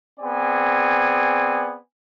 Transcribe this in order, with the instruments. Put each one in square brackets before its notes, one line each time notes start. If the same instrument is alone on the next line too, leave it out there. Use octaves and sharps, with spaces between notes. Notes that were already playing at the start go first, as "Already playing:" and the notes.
[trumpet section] B3 C4 G#4 D5 G#5